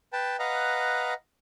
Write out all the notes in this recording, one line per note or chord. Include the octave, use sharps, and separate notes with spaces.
B4 G5 A5
B4 D#5 F5 F#5 A#5